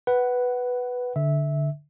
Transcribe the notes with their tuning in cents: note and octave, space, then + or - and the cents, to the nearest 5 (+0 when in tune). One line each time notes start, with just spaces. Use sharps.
B4 +0 F#5 +15
D3 +0 E5 -15